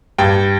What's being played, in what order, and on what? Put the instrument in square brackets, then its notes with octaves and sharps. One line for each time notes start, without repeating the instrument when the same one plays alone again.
[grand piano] G2 G5